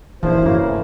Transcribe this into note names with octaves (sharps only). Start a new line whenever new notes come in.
E1 A#1 F#2 E3 F3 E4 C5
G2 C#3 A#3
A3